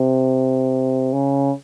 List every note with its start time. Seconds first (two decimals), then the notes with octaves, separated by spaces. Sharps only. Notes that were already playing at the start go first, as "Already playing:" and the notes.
Already playing: C3
1.13 C#3